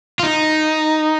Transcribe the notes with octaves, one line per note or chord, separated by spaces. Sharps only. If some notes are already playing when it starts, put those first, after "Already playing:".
F4
D#4